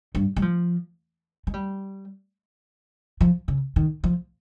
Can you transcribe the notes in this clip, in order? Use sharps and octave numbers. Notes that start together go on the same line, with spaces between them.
G2
G3
F3
G#3
G3
F3
C#3
D#3
F3